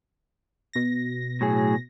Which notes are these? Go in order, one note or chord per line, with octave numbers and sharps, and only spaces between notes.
B2 A#6
A2 F#3 G#4